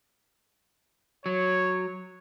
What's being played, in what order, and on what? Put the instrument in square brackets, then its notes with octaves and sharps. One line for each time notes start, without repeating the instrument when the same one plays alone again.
[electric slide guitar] F#3 [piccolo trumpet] C#5